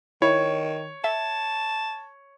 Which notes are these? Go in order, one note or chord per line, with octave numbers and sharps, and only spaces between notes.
D#3 E4 C#5
E5 A5